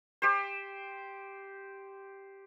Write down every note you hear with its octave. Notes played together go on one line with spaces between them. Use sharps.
G4 C5